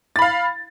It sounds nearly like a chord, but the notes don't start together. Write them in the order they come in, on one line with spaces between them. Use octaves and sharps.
A6 B5 F5